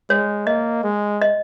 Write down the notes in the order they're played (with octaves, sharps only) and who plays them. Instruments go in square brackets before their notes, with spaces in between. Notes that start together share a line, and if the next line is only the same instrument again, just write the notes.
[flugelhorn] G#3 [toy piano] C#5
[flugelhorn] A#3 [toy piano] D#5
[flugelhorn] G#3
[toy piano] D#5